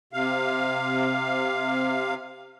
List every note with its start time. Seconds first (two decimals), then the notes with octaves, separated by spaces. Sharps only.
0.13 C3 F5